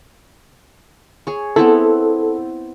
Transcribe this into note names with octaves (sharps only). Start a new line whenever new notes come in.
G#4 C#5
B3 C4 E4 A4